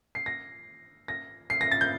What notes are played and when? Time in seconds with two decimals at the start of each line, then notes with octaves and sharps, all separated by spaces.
0.15 C7
0.26 A#6
1.08 A#6
1.50 C7
1.61 A#6
1.71 A6
1.81 G6